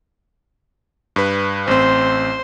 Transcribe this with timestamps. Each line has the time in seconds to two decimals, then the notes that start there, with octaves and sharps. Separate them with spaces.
1.16 G2 B4
1.67 A1 C4 C5